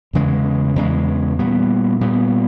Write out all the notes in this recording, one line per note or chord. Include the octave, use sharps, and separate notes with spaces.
E2 C#3 E3 G#3
E2 C#3 E3 G#3
A#2 G3 B3
A#2 G3 B3